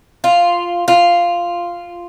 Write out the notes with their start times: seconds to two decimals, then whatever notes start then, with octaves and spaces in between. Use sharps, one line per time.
0.24 F4
0.88 F4